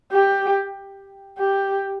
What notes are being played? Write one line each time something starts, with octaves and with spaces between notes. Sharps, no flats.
G4
G4